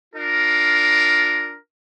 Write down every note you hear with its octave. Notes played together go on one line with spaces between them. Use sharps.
D4 F4 A#4